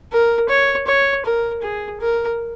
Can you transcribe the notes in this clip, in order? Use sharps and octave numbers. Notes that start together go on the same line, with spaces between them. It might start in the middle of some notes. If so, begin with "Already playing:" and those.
A#4
C#5
C#5
A#4
G#4
A#4